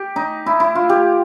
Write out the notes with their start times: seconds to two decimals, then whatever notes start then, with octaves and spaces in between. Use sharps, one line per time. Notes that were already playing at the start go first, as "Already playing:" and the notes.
Already playing: G4
0.16 D#4
0.46 E4
0.60 E4
0.75 F4
0.89 G4